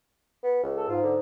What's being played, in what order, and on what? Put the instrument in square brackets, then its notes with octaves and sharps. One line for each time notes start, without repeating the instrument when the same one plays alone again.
[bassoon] B3
C#2
[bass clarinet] A4
[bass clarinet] G#2 [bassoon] F4
[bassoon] D3